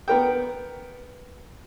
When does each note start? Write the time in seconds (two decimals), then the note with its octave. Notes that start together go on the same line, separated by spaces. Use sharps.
0.08 B3 A#4 G5